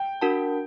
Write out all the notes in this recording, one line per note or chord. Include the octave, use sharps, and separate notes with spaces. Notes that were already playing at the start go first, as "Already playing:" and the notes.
Already playing: G5
D4 F#4 A#4 F#5 A5